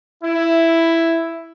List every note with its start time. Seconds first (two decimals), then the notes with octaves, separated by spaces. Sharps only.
0.23 E4